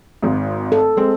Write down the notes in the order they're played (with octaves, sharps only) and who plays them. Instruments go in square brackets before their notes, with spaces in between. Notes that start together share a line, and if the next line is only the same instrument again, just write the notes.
[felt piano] G#1 G#2
[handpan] A4
[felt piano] G#3 C4